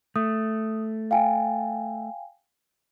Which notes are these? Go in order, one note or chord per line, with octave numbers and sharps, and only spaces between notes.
A3 D#6
F5 G5 G#5